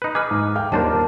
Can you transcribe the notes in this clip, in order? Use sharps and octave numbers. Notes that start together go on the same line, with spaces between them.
D#4 B4
G#4 B4 D6 F6
G#2
F5 G5 F6
D#1 D#2 D4 A#4 C5 A5